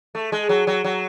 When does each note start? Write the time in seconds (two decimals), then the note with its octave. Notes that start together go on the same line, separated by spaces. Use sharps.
0.15 A3
0.32 G#3
0.49 F#3
0.67 F#3
0.84 F#3